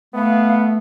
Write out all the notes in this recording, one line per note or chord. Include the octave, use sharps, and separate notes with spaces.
A3 B3 F5